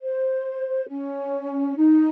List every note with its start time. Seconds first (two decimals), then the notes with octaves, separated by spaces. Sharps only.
0.02 C5
0.88 C#4
1.75 D#4